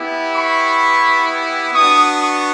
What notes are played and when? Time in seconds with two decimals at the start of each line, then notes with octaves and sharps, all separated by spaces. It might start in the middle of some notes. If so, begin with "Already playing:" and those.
Already playing: B3 E4 G4
0.35 B5 C#6
1.74 B3 D4 F#4 C#6 D#6
2.21 C#6 D#6